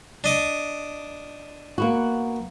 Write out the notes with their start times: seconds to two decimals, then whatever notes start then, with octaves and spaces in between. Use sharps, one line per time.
0.24 D4 D#5 D6
1.78 A#3 B3 F#4